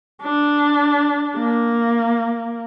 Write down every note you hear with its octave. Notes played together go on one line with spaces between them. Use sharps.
D4
A#3